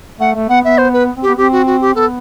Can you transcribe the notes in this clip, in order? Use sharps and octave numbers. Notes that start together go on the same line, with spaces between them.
A3 F#5
A3
B3 F#5
B3 E5
C5
B4
C4
B3 G4
C4 G4
F#4
F#4
G4
B3 A4